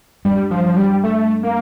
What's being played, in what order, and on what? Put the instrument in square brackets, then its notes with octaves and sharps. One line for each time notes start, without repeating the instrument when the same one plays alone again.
[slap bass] G2 [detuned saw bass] G3
[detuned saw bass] F3
F3
G3
A3
A#3